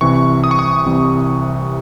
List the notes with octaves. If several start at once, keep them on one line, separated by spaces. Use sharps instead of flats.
C2 C3 E3 C#6
D#6
C#6
D#6
C2 C3 E3